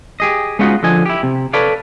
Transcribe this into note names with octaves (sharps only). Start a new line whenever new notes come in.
G4 G#4 D#5
G#3 B3 C#4 D#4 F4 F#4
D3 F3 D#5 G#5
E4 G4
C3
A4 B4 C#5 D5 F5